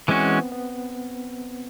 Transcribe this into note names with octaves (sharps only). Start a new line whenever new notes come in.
E3 G#3 C4 C#4 F#4
B3
B3